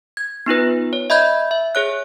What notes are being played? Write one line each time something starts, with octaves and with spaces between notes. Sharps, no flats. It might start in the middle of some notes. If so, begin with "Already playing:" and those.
G#6
B3 D#4 F4 B4
C#5
D#5 E5 B5 G6 G#6
E5
G#4 C#5 F#6